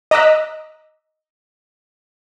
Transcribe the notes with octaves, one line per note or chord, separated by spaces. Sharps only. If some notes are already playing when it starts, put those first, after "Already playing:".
D#5 A#5 D6 E6 F#6 B6